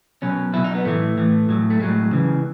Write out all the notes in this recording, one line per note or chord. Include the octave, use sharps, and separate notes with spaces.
B2 F#3 C#4
B2 F#3 E4
D#4
B3
A2 E3 A3
A2 E3
A2 F#3
A3
A2 F#3 G#3
C#3 E3